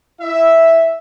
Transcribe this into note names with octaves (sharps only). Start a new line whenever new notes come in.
E4 E5